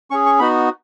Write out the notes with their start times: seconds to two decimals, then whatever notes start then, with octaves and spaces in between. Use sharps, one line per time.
0.10 C#4 G#4 C#6
0.26 C#6
0.39 B3 D#4 F#4 B5